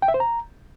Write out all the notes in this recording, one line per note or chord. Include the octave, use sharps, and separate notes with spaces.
G5
E5
C5
A#5